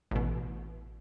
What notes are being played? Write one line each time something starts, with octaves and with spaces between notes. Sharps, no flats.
A1 B2